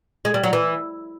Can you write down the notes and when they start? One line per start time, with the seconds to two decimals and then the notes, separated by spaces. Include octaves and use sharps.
0.25 G#3
0.34 G3
0.43 F#3
0.53 E3